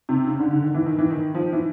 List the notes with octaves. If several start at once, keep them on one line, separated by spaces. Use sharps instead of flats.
C3
C#3
D3
D3
D#3
E3
D#3
E3
D#3
F3
E3